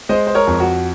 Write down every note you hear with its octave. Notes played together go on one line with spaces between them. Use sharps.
G#3 C5 D#5
C5
A#4 C#5
F2
F#4